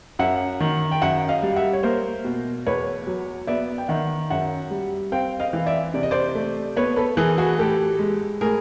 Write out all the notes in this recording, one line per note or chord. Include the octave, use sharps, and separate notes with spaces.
F#2 E5 F#5
D#3
G5
F#2 E5 F#5
D#5 F5
G3
E5 F#5
C#5
A#3 A#4 C5
B2
E2 B4 C#5
F#3
B3 D5 E5
G5
D#3 E5 F#5
F#2 E5 F#5
G3
C4 F5 G5
D#5 F5
E3
D5 E5
C3 D5
D#5
C5 D5
A3
B3 B4 C#5
A4 B4
E3 G#4 A#4
F#4 G#4
A2 G4 A4
G#3
A2 G#4 A#4